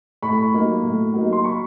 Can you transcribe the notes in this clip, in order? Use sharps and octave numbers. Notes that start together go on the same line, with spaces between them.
A2 B5 C#6
F#3 A#3 D#4
A2
F#3 A#3 D#4
C6
B5 C#6